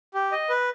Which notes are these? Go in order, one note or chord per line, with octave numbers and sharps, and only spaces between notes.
G4
D#5
B4